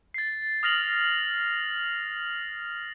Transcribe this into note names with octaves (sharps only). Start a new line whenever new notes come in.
A6 C7
D#6 F6 A#6 F7 F#7